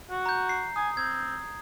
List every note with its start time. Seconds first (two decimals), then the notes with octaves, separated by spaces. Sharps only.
0.10 F#4
0.26 A#5 G6
0.49 C7
0.76 G#5 D#6
0.97 C4 G#6